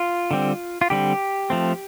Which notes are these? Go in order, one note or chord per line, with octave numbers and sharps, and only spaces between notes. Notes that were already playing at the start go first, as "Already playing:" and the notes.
Already playing: F4
D3 G3 C4
F4
D3 G3 C4 G4
F3 A3 C4